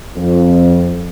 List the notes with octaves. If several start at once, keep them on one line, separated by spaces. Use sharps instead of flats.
F2